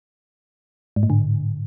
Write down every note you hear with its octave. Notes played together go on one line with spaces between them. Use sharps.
G#2
A2
D3